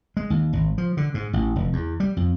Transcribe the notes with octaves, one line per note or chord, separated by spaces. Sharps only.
G#3
D#2
G#1
F3
D3
G#2
A1
F1
E2
G3
F2